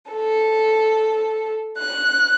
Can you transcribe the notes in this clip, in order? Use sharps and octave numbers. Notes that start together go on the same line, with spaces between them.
A4
F#6